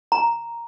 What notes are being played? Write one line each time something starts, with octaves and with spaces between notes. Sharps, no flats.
A#5